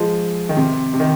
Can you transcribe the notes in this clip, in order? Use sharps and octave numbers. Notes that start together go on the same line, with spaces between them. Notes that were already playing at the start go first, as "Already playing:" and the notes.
Already playing: F3 G#3
D#3
C3
C3
D#3